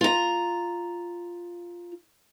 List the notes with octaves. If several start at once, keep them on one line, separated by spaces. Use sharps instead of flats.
F4 A#5